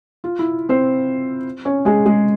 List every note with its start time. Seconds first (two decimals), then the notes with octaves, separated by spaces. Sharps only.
0.24 F4
0.39 E4
0.69 C4 C5
1.65 C#4 C#5
1.85 G#3 G#4
2.06 G#3 G#4